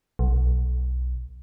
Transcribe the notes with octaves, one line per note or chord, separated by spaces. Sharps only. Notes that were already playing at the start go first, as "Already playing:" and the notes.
B1